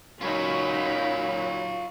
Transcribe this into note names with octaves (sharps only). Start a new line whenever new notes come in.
A#2 F#3 C#4 D#4 F4 C#5 B5